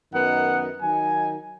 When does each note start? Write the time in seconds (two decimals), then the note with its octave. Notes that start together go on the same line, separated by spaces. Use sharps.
0.13 F#2 D#3 B3 D#4 F#5
0.81 D#3 F#3 D#4 G#5